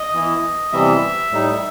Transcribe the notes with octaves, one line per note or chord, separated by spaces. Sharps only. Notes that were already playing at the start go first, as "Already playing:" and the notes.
Already playing: D#5
E3 B3 E4
C3 E3 G3 B3 E5
A2 G3 D#4